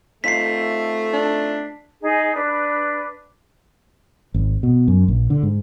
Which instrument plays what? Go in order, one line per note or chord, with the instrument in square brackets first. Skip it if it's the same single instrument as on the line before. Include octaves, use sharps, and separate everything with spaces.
[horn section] A3 [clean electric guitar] C4 D#4 F4 [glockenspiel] B6 C7
[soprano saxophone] D4
[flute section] D#4 G#4
D4 B4
[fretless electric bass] G#1
B2
F#2
A#1
D3
G#2